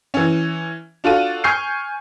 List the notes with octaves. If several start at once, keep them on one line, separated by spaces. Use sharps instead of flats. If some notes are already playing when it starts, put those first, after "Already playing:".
E3 C#4
D4 F4 F#4 A4 D#7
G#5 C#6 F6 G6 C7